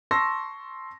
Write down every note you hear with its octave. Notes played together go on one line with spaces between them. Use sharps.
A5 C6 C#6 E6 A#6